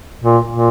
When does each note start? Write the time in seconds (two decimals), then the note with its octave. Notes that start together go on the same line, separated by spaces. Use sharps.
0.24 A#2
0.51 A#2